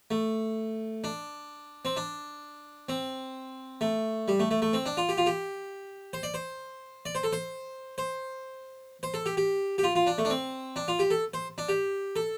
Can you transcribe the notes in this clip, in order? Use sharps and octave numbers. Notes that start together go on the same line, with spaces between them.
A3
D4
C4
D4
C4
A3
G3
A3
A3
A3
C4
D4
F4
G4
F4
G4
C5
D5
C5
D5
C5
A4
C5
C5
C5
A4
G4
G4
G4
F4
F4
D4
A3
D4
C4
D4
F4
G4
A4
C5
D4
G4
A4